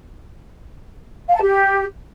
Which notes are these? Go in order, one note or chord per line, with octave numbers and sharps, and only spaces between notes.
F5
A5
G4